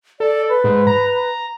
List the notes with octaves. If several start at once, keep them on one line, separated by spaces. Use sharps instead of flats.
A4 D5
B4
G#2
A#5